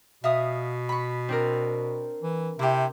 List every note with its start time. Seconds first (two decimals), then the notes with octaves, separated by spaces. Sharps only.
0.24 B2 E5 F5 D#6
0.89 B5 C#6
1.29 C4 D4 A#4
2.22 E3
2.59 C3 E4 G4